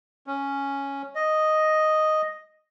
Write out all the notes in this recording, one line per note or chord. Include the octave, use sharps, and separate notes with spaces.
C#4
D#5